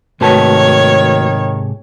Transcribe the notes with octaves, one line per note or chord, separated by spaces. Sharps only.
G#2 C3 D#3 A3 F#4 B4 C#5 A5